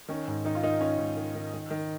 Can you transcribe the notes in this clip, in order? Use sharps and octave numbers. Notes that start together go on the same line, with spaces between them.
D#3 C#4
G#2
D#3 D#4
F4
D#3 D#4
D#3 C#4
G#2
D#3
D#3
D#3
D#3